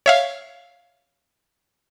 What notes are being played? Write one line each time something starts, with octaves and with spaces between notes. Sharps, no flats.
C#5 E5 F5